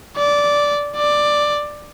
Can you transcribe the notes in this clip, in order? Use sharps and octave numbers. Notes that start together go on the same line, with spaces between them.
D5
D5